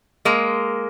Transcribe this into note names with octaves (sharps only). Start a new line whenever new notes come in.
G#3 A#3